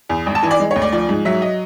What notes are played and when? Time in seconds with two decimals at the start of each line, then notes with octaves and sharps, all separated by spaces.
0.09 E2
0.26 G#1
0.35 A5
0.43 E3 G#5
0.51 D5
0.60 G#3
0.71 C#5
0.76 D2
0.82 D5
0.92 F3 D5
1.09 G#2
1.25 F#3 E5
1.42 D#5